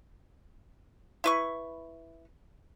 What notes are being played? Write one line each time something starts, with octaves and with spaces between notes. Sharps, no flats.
E4 B4 C#6